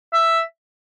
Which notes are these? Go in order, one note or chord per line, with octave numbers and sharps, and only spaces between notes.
E5